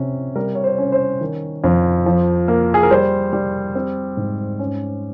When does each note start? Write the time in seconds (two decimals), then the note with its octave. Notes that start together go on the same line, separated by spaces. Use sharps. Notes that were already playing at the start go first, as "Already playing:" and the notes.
Already playing: C3 C#4
0.36 G3 A#4
0.55 C#5
0.64 C5
0.78 C#4
0.92 C5
1.21 D#3
1.64 F2
2.06 F3
2.48 A#3
2.74 G#4
2.83 A#4
2.91 G3 C5
3.33 G3
3.75 C4
4.17 G#2
4.59 C#4